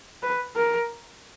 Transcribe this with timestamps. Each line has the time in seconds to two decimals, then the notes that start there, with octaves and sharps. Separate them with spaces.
0.23 B4
0.56 A#4